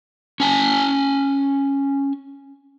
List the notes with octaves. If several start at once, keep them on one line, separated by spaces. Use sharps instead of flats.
C#4 G#5 A5